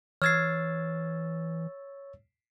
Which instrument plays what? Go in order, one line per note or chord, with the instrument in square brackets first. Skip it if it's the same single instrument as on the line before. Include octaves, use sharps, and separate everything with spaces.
[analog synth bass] E3 [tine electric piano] C#5 E6 A6 [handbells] F6 G#6 C7